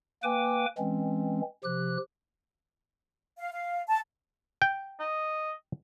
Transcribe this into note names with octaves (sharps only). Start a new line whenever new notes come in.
A#3 B4 G5 G#5 D6
E3 G#3 C4 C#4
C3 F3 G4 F#6
F5
F5
A5
G5
D#5